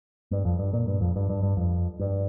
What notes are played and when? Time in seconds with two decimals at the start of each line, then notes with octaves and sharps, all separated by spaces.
0.31 G2
0.45 F2
0.59 G2
0.73 A#2
0.87 G2
1.01 F2
1.16 G2
1.29 G2
1.43 G2
1.57 F2
2.00 G2